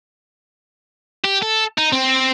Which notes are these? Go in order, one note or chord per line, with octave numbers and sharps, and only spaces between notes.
G4
A4
D#4
C4